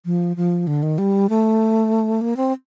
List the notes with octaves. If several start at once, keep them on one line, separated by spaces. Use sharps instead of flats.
F3
F3
D3
D#3
G3
A3
A#3
C4